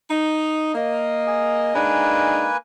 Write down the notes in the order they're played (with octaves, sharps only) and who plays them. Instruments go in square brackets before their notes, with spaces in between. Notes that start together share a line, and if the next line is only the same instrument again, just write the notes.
[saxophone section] D#4
A#3 D#5
[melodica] G#4
[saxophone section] G#3 D4 D#4 [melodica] A#3 B4 G#5